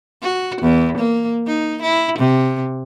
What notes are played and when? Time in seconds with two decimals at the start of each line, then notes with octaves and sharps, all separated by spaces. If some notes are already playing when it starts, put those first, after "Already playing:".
0.22 F#4
0.62 E2
0.98 A#3
1.47 D#4
1.82 E4
2.19 C3